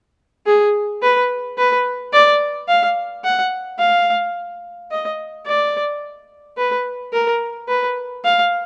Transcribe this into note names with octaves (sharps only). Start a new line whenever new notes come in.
G#4
B4
B4
D5
F5
F#5
F5
D#5
D5
B4
A#4
B4
F5